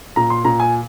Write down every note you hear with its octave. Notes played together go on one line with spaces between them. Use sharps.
A#2 A#5
C6
A#2 A#5
G#5